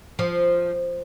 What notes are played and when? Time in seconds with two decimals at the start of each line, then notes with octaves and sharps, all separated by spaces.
0.19 F3